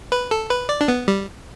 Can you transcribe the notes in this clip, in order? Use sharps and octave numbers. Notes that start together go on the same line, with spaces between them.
B4
A4
B4
D5
D4
B3
G3